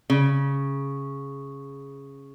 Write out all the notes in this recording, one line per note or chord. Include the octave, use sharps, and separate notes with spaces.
C#3